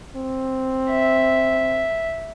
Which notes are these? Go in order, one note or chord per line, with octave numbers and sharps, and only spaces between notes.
C4
E5